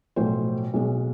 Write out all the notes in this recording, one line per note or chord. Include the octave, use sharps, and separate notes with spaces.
B1 A2 F3 C5
B1 B2 G#3